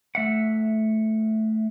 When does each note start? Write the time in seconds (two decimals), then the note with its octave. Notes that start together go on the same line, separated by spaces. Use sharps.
0.15 A3 E5 F#5